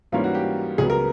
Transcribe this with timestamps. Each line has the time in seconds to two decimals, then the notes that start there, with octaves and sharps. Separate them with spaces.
0.12 G#2 E3 G3 A#3 C#4 F4
0.24 F#4
0.35 G4
0.78 C#2 C#3 F#3 B3 G#4
0.90 A#4